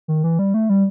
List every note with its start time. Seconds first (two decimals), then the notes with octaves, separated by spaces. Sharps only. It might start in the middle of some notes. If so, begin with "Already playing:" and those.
0.08 D#3
0.24 E3
0.39 G3
0.54 A3
0.69 G3